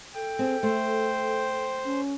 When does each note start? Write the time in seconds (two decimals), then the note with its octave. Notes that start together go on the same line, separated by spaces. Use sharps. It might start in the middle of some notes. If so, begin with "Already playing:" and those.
0.15 A4 G5
0.39 C4 G#4
0.63 A3 C5
1.84 C#4